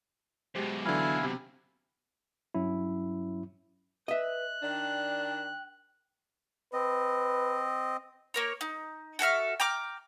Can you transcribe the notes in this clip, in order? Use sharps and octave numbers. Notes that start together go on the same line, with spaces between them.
F#2 B2 G#3 G4 C5
D3 E3 F#3 E4 F5 G#5
C3
G2 F#3 C#4 E4
B4 D#5 E5 F#6
D#3 D4 G5
C4 B4 D#5
A#3 A#4 C#5
D#4
F#4 A4 E5 F6
G5 A#5 D6 F6